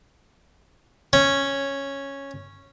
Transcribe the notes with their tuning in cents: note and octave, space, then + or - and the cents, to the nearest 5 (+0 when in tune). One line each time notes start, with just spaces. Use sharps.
C#4 -5